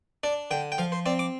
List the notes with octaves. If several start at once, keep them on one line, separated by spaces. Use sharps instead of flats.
D4 D5
D3 G5
G5
F3 F5
C5
C4 D5
D6